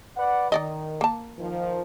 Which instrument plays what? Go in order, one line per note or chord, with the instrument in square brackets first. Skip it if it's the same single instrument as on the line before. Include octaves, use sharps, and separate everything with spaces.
[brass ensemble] B4 D5 F#5
[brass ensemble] D#3 [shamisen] D#4 D5 D#5
[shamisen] A#3 A5
[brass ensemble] D#3 F3